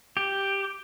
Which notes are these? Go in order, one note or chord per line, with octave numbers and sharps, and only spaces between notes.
G4